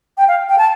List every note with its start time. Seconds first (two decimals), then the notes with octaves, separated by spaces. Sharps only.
0.17 G5
0.28 F5
0.49 G5
0.58 A5